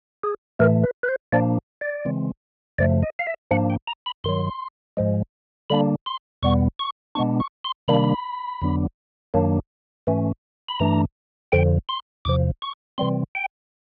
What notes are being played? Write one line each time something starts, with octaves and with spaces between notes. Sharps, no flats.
G#4
A2 E3 A3 A#4
B4
B4
C5
A#2 F3 A#3 D4 D5
D5
C#3 E3 G#3 C4
F#2 C#3 F3 A3 D5
D#5
F5
E5
G#2 F3 A#3 D4 F#5
G5
A#5
B5
G2 D#3 F#3 C6
G#2 F3 G#3
D3 G3 A#3 D4 B5
C6
E2 B2 G3 B3 C#6
C#6
B2 G#3 B3 D4 C#6
C#6
C6
C3 D#3 G3 A#3 D4 B5
F2 D3 F#3 B3 D4
F#2 D#3 F#3 A#3 D4
G#2 E3 A3 C#4
B5
G2 E3 A3 D4 A#5
F2 D3 F3 G5
C6
E2 C3 F3 D6
C#6
C3 E3 G3 C4 C6
G5